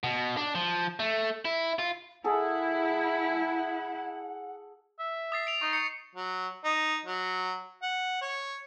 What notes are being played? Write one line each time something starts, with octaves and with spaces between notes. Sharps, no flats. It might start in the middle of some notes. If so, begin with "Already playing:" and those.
B2
D4
F3
A3
E4
F4
E4 G#4 A4 F#5
E5
D#6 A6 C7
D7 F7
D#4 C#6
C#6 C#7
F#3
D#4
F#3
F#5
C#5